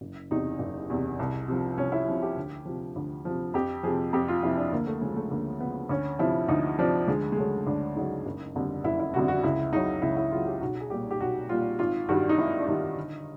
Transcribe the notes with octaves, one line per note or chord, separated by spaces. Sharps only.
F#1
E2 C3 D#4
F#1
E2 C3
C2
C3 F3
C2 C#4
E4
C3 F3
G4
D2
C3 F3
D2
C3 F3
F2 G4
C3 F3 G#4
F2 G4
F4
C3 F3 E4
D4
D2 A#3
A3
C#3 F3 G#3
A3
D2 A#3
C#3 F3 B3
D2 C#4
C3 F3 E4
D2 D#4
C3 F3 D4
D2 G#3
G#3
C#3 F#3 A3
D2 D4
C#3 F#3 D#4
F#1
F2 D3 G3
F#1 E4
E4
F2 D3 G3 F#4
F#4
C#2 E4
C#3 F#3 D#4
C#2 E4
E4
C#3 F#3 F4
G4
B1 F#4
G#4
A#2 G3 G4
G4
B1 F#4
A#2 G3 F4
G#1 F4
G2 D#3 G3 F#4
D#4
G#1 E4
D4
G2 D#3 G3 D#4
G1